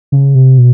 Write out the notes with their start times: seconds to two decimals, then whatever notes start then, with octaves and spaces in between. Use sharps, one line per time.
0.12 C#3
0.35 C3
0.58 B2